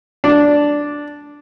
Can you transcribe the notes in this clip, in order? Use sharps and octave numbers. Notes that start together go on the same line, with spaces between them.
D4